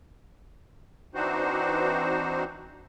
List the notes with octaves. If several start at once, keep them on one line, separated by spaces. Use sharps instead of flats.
E3 C4 D4 D#4 F#4 C5